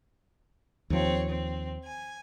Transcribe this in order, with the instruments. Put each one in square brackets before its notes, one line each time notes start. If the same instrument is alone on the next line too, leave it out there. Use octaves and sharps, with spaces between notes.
[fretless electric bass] D#2 F3 [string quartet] C4 C#5
[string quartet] C4
G#5